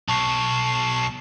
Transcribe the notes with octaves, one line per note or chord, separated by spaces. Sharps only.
B1 A5 C#6 C7